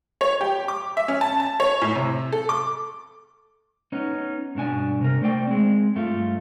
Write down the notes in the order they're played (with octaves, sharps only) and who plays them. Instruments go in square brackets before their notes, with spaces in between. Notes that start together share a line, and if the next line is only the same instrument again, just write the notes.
[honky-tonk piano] C#5
G4
D6
E5
C#4
A5
A5
C#5
A2
C3
A4
D6
[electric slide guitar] B3 C#4 D#4
G2 B2 D4 G#5
C3 A#4
A3 C5 D5 G5
G#3 C4
G2 A3 F4